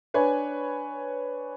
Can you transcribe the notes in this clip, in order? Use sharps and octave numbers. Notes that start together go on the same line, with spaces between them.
D4 B4 C#5 G#5